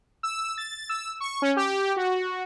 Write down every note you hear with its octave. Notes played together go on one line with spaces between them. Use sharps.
E6
A6
E6
C#6
C#4
G4
F#4